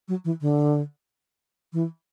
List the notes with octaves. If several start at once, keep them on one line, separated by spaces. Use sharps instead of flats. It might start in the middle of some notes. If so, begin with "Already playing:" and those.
F#3
E3
D3
E3